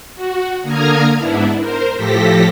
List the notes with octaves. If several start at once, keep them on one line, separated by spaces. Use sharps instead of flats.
F#4
D3 A#3 A#5 D#6 F6 G#6
G#2 B3 D4 E4
A#4 C5
A2 F3 G4 A4 A#6 B6